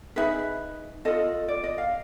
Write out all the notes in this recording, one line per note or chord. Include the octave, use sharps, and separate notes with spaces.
D#4 G#4 B4 E5
F4 A4 D#5
D5
D#5
F5